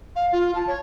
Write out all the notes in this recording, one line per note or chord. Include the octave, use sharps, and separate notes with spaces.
F5
F4
A5
C#5